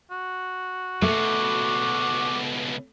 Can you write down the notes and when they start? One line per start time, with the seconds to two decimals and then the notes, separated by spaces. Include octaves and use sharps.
0.11 F#4
1.02 C#2 B2 A3 D6